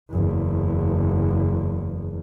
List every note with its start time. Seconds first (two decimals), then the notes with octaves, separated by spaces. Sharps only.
0.11 F#1 E2